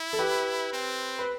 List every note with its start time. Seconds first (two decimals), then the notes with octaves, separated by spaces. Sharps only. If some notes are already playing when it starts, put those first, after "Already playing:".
Already playing: E4
0.13 A4
0.19 G4 B4
0.73 C4
1.19 B4